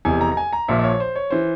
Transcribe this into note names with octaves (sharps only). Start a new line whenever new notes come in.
F1 E2 C3 G#5
A#5
A#5
G#5
A#5
A#1 A#2 F3 E5
E5
C#5
C5
C#5
E3 C5